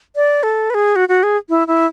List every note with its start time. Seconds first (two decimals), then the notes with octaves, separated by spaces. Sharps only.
0.16 D5
0.43 A4
0.70 B4
0.74 G#4
0.96 F#4
1.09 F#4
1.23 G#4
1.49 E4
1.68 E4